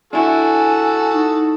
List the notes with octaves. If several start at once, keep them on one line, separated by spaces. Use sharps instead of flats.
D4 E4 F#4 A4 G#5
D#4